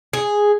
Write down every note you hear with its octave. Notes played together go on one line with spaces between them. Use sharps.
G#4